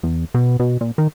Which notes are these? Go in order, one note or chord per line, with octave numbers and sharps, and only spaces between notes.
E2
B2
B2
A#2
D#3